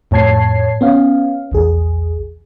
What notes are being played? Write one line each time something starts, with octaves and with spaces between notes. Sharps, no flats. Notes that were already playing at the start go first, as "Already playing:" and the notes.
F2 A2 C#5 A5 G#6 C7
B3 C#4 F5
A#1 E2 G#4